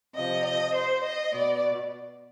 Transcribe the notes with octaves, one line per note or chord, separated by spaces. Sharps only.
C3 F3 D#5
D#5
C5
D#5
B2 D5